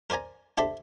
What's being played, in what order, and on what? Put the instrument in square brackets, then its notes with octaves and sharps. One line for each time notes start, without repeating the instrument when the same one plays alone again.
[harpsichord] A#4 C5 D5 G#5 A#5
D4 G4 A4 C5 E5 B5